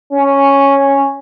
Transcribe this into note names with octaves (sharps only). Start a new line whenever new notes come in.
C#4